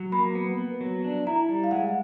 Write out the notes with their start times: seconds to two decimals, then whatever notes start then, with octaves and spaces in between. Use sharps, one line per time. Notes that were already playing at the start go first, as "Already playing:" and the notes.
Already playing: F#3
0.12 A#3 B5
0.35 B3
0.58 B3
0.81 F#3
1.04 D4
1.27 E4 A#5
1.49 G3
1.64 F5
1.71 G#3 F#5